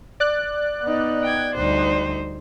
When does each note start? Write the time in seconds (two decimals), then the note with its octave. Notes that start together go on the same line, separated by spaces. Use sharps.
0.20 D5 F#6
0.82 B3 D#4
1.23 G5 G#6
1.55 D2 G3 D#4 C5